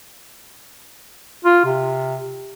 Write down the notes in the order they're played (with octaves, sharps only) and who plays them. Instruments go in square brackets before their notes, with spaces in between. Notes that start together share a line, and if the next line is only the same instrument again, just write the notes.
[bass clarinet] F4
C3